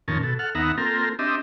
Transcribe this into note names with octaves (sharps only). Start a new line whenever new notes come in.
F2 A#2 D#3 C#4 A#4 A5
B2 A4
A4 F#5 F6
D#2 B3 D#4 E5 F#5 A#5
A#3 C4 F4 A4 A#4
C4 D4 G4 D#5 E5